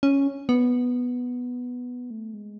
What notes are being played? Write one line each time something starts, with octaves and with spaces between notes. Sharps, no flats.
C#4
B3
A3
G#3